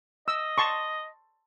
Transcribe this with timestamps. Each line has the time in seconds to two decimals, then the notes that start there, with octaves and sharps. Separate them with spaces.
0.28 D#5 E6
0.58 A5 C6 C#6